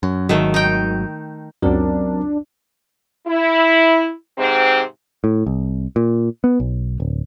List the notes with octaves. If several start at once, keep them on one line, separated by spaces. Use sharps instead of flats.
F#2
G#1 G#2 D#3 F#3 A3
D#4 G5
C#2 F#2 F#3 C4 D4 A#4
E4
G#2 C3 C4
A2
C2
A#2
B3
B1
D1